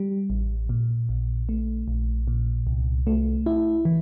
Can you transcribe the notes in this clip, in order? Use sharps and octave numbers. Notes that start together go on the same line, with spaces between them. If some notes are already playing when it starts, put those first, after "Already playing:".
Already playing: G3
A1
A#2
A#1
A3
A#1
A#2
C2
A3
E4
E3